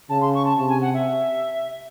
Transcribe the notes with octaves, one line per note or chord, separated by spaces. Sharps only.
C#3 A5
C6
C#6
A5
C3 A5
G#5
F#5
E5